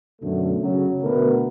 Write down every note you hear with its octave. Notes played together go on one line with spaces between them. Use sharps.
F#2 B2 D3 A3
C#3 F#3
B2 D3 A3 B3 A#4 B4